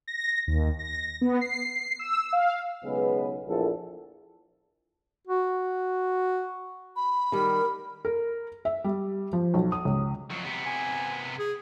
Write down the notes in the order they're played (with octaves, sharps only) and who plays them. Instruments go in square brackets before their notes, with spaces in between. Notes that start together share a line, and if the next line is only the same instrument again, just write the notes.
[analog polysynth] A#6
D#2
A#6
B3
C7
E6
F5
[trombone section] B1 C#3 G#3 B3 G#4 B4
A#1 E2 A4
[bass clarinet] F#4
[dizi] B5
[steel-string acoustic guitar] D#3 G3 [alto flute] A#4
[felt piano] A#4
E5
G3
F3
B1
D#6
C#2
[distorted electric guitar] F2 F#3
C3 B3
[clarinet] G#5
G#4